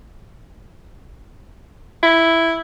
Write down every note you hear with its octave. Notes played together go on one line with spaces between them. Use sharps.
E4